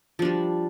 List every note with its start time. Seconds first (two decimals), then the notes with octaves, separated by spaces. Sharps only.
0.19 F3
0.22 D4
0.25 G3